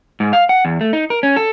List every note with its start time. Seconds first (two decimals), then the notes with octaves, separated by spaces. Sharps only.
0.20 G#2
0.33 F5
0.49 F#5
0.65 E2
0.81 A3
0.93 D#4
1.10 A#4
1.23 C#4
1.36 A4